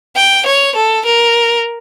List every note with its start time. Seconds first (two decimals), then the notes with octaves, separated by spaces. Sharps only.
0.16 G5
0.46 C#5
0.75 A4
1.05 A#4